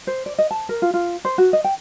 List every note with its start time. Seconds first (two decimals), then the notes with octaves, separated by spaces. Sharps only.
0.07 C5
0.26 D5
0.38 D#5
0.51 A5
0.69 A#4
0.82 F4
0.94 F4
1.25 C5
1.38 F#4
1.53 D#5
1.64 G5